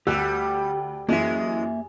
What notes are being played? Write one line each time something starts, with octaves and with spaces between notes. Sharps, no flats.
D2 G3 G4 E6 F#6
F#2 E3 G#3 A#3 E5